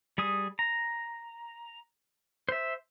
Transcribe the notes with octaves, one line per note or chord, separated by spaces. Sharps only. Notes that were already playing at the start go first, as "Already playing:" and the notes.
G3 G#4 D#6
A#5
C5 E5